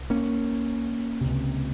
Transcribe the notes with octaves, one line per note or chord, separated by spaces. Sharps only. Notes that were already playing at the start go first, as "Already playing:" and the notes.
Already playing: C2
A#3 C#4
C#2 C3